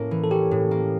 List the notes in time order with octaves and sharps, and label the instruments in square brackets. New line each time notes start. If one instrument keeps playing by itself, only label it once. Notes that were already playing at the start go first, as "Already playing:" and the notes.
Already playing: [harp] A2 A#3 C#4 [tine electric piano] A#4
[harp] E3
[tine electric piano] A4
[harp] C#4 [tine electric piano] G4
[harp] A2
A#3